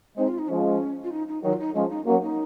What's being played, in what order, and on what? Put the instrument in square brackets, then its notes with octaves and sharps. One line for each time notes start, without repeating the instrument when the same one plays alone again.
[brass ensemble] G#3 C4 [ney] D#4
[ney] F4
D#4
[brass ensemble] F3 G#3 [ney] C#4
[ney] F4
D#4
D#4
[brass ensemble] D#3 F#3 [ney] D#4
[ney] F4
D#4
[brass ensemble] F3 G#3 [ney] C#4
[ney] D#4
[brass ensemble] F#3 A#3 [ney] C#4
[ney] D#4